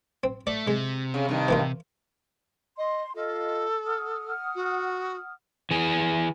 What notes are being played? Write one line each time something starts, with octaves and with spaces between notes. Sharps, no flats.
C4
A3 D5
C3 G#3
C#3
G2 D#3
E3 A#3 F4
D#5 C6
F4 A4 D#5
F#5 D#6 F6
F#4
E3 G#4